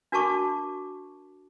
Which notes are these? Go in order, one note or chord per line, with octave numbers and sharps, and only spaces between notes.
D4 F#4 A#4 A5 C#6 D6